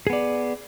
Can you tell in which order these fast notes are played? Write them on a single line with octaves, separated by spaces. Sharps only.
G#4 B3 D5